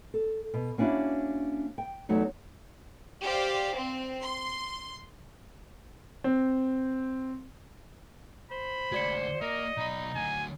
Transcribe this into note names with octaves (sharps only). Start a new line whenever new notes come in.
A4
B2
A#3 C#4 D4 E4 F#4
G5
E2 F#3 A3 D#4
G4 C5 D5 F5
C4
C6
C4
C5 B5
D2 G#3 F#4 D5 C#7
A#3 A#4 D#5
B1 D#4 B5
D2 F#3 G#5